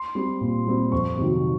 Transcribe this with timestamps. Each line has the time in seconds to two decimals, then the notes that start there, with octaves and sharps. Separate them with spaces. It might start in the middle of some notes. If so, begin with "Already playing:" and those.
Already playing: C6
0.15 G3 C4
0.41 A#2
0.67 G3 C4
0.92 F2 C#6
1.17 C3 D#3 F#3